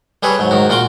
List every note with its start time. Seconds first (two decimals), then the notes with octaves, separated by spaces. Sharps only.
0.23 G3 G#4 A4 B4 C#5
0.39 G#2 F#3
0.51 G#2 D#3 F#4
0.69 A#2 F4 F#4 F#5 C6 D6